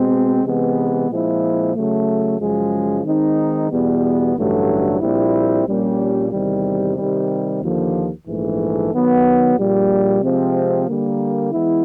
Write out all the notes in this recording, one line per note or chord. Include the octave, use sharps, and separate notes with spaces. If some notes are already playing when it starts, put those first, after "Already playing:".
Already playing: B2 G#3 C4
C3 E3 G#3 B3
A#2 F3 G#3 C4 E4
C#3 F#3 A3
F#2 C#3 F3 G#3
D#3 G#3 C4 D#4
E2 B2 G3 B3
A1 G2 D3 F#3 A3
A#1 A#2 G3 C4 E4
A#1 A#2 G3 A#3 C#4
E2 C3 D#3 G3
C3 D#3 G3
D#2 D3 F3 A#3
A#1 G#2 E3 A3
D#3 F#3 B3
A#1 A#2 G3
C3 F3 G#3 C4
D3 G3 A#3
E3 G#3 B3 E4